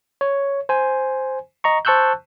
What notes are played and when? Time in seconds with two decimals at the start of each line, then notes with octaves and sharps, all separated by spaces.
0.21 C#5
0.69 C5 G#5
1.64 D#5 A#5 C#6
1.85 C5 A5 C#6 E6 F#6 G6